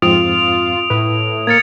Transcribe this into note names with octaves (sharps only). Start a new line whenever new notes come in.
F2 G#2 C4 F4 D#6 D7 F7
A2 B4
A#3 F6 G#6 A6 C#7